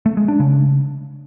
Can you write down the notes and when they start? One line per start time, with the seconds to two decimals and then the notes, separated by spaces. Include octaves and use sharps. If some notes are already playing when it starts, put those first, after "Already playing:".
0.06 A3
0.17 G#3
0.28 D4
0.40 C#3